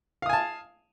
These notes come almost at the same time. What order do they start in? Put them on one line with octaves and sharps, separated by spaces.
F5 D#6 G#5 A5